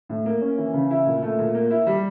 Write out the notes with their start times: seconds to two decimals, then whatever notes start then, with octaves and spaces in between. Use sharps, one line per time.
0.09 A2
0.26 A#3
0.42 C#4
0.58 E3
0.74 C#3
0.91 E4
1.06 A#2
1.22 A3
1.38 A#2
1.55 A#3
1.71 E4
1.87 G3